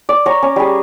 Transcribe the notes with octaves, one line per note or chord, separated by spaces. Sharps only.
D5
C#5 A#5
C#4
G3 G#4